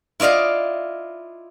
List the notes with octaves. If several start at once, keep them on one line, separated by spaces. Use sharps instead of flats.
E4 F4 D5 D#5 F5